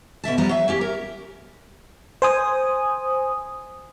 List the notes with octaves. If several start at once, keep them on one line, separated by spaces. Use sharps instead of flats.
B2 D3 E5 A5
E2 F3 G3 B3 A#5
F#3 E5
A#3 C#4 G4
A#4
C5 G#5 D#6